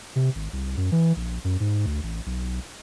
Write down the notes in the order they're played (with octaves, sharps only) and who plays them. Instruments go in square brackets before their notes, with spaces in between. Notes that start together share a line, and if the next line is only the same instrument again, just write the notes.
[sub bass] C3
G#1
C2
F#2
E3
A#1
F#2
G#2
D2
A1
B1